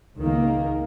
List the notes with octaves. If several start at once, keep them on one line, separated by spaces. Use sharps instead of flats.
C#2 D#3 A#3